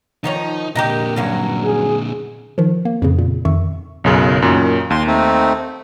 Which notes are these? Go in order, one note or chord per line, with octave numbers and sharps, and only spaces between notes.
D#3 F3 D#4 C#5
A#2 D3 G4 A#4 D#5
G2 F#3 C#4
G#4
D#3 F3
A#3
F2 A2 C#3
A#2
F2 D#3 E5 C#6
B1 F#2 C#3
F#2 A#2 D#3
D#2 C6
A3 C4 D#4